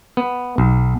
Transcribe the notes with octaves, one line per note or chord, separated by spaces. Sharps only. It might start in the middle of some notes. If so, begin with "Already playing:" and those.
B3
B1